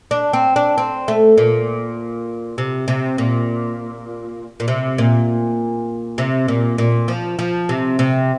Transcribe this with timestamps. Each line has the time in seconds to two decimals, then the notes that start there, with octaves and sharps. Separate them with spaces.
0.11 D4
0.33 C4
0.56 D4
0.78 C4
1.08 A3
1.38 A#2
2.58 C3
2.88 C3
3.18 A#2
4.60 A#2
4.68 C3
4.98 A#2
6.18 C3
6.48 A#2
6.78 A#2
7.08 F3
7.39 F3
7.69 C3
7.99 C3